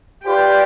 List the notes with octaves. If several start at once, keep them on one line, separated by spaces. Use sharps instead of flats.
F4 G4 B4 D5 G5